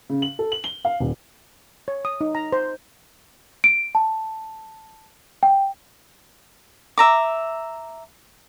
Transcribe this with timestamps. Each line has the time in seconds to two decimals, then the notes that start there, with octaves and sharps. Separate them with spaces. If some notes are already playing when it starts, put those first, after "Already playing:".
0.10 C#3
0.22 F#7
0.39 A4
0.52 F#7
0.64 G7
0.85 F5
1.00 D#1
1.88 C#5
2.05 D#6
2.21 D#4
2.35 A#5
2.53 C5
3.64 D7
3.95 A5
5.43 G5
6.98 E5 A#5 D6